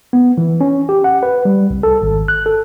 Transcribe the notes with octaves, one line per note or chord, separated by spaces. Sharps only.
B3
E3
C#4
G4
F#5
B4
G3
C2
A4
G#1
F#6
A4